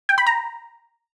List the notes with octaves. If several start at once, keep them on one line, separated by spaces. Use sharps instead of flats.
G5
B5
A#5